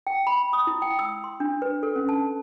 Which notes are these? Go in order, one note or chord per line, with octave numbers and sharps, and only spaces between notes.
G5
B5
D#6
E4
G5
E6
C6
D4
B4
A4
C#4
A5